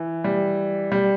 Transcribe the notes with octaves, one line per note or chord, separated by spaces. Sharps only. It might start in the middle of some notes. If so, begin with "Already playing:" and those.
Already playing: E3
G3
G3